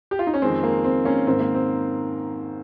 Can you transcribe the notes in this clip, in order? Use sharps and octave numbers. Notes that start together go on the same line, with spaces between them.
G4
F4
D#4
C#4
F2 D#3 G#3 C4
A#3
C4
A#3 C#4
G#2 D#3 A#3 C4
A#3
C4